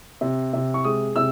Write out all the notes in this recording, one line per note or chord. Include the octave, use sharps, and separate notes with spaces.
C3
C3
C#6
G#3 D#6
C3 E6